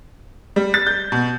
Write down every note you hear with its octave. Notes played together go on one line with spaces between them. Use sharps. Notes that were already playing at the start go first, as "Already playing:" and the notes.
G3
A6
G6
B2